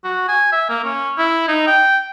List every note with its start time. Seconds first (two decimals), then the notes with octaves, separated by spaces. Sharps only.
0.04 F#4
0.28 G#5
0.52 E5
0.69 A#3
0.84 C#4
1.18 E4
1.48 D#4
1.67 G5